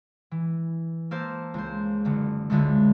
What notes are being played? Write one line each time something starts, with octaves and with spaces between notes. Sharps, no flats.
E3
A#3 A4 C5
C#2 C5
F#1 D3
C#2 D3 G#3 A3